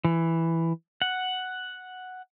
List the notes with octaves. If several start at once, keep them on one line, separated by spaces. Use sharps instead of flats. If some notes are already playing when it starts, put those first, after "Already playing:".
E3
F#5